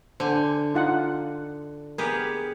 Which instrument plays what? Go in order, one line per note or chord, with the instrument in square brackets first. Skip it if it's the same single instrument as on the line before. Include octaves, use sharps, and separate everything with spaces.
[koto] D3 G#5 [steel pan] C5
[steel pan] D#4 F4 F#5
[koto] B3 G4 G#4 [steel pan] A#4